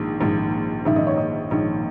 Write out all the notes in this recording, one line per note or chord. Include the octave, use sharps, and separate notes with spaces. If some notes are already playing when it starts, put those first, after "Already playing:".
Already playing: A#1 G#2 D#3
A#1 G#2 D#3
A#1 G#2 D#3 E5
D#5
C#5
D#5
A#1 G#2 D#3